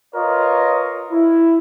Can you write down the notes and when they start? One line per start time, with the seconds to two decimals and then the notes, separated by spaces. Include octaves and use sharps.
0.14 F4 A#4 B4 C#5 D#5
1.10 E4